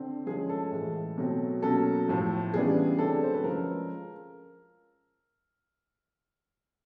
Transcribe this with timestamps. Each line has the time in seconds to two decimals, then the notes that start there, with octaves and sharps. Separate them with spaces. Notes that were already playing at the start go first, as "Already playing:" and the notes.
Already playing: D3 C4
0.26 F3 G#3 C#4 G#4
0.49 A4
0.71 A2 E3 G#3
1.18 B2 F#3 A3 C4
1.62 B2 F#3 A#3 C#4 A4
2.08 A2 F3 A3
2.52 C#3 E3 G3 B3 D4 G#4
2.99 D3 F#3 A3 C4 A4
3.23 C5
3.34 B4
3.44 F3 G#3 C#4 A#4